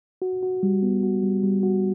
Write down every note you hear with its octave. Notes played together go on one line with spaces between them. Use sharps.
F#4
F#4
G3
B3
F#4
G3
G3
F#4